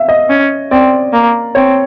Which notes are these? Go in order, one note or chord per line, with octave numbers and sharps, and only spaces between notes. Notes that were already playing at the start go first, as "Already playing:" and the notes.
Already playing: E5 F5
D#5
C#4
C4 D5
A#3
C4 C#5